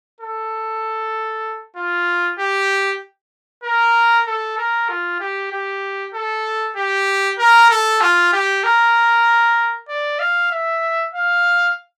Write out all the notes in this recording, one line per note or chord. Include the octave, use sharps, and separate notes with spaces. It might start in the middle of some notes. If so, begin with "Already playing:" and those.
A4
F4
G4
A#4
A4
A#4
F4
G4
G4
A4
G4
A#4
A4
F4
G4
A#4
D5
F5
E5
F5